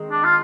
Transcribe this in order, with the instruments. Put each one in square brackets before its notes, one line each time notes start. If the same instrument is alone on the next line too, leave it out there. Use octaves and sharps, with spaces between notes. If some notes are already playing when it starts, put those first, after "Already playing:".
Already playing: [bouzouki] D#3 G#3 C4
[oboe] D4
F4